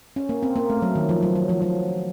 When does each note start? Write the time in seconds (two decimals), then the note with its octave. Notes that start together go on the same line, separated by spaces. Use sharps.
0.16 C#4
0.29 A#3
0.43 C4
0.56 A#3
0.70 A3
0.82 F#3
0.95 D#3
1.09 F3
1.23 F#3
1.35 F#3
1.49 F3
1.62 F#3